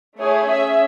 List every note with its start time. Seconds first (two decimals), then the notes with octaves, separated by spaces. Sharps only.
0.17 A3 E4 G#4 C#5
0.47 C#4 G#4 E5